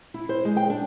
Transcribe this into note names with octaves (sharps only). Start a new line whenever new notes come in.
E4
C5
G#3
G5
D4